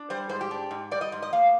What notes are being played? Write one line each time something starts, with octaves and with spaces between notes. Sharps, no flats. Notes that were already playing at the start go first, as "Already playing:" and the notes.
Already playing: D4
G3 C5
G#2 C5
G4
D4
G#2
G3 D5
D#5
G#2
D#5
A#3 F5